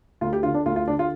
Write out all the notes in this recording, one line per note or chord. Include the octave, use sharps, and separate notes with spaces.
D2 F4
G4
D3 F4
D4
D2 F4
F4
D3 D4
F4